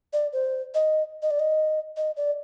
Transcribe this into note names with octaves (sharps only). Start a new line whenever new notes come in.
D5
C5
D#5
D#5
D5
D#5
D#5
D5